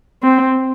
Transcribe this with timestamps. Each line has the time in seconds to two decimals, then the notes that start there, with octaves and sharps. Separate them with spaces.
0.23 C4